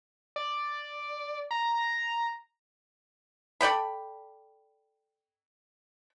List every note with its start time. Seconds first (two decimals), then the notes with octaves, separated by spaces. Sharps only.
0.36 D5
1.51 A#5
3.61 A4 D5 G5 B5